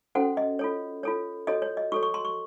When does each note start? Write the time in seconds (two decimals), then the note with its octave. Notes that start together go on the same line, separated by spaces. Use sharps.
0.15 C#4 F#4 A4 C5 F#5
0.37 D#5
0.59 F4 A4 C#5
1.03 F4 A4 C#5
1.47 F#4 A4 C#5 D#5
1.62 C#5
1.77 D#5
1.92 F#4 A4 C#5 C#6
2.03 C#6
2.14 C6
2.25 C#6